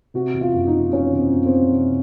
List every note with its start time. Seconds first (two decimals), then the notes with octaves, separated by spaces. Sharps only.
0.14 C3 F#4
0.34 E2
0.41 F4
0.53 F#1
0.67 D#4
0.73 F3
0.92 C3 C#4
1.12 E2
1.19 C4
1.33 F#1
1.46 C4
1.51 F3
1.71 C3